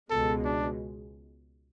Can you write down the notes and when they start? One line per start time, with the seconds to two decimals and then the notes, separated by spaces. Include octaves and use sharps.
0.10 C#2 B2 G#3 A4
0.45 D4